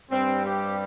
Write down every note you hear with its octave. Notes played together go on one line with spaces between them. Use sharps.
G2 G3 C4
G4